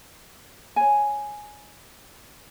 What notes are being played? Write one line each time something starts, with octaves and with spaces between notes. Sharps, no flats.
C#5 G#5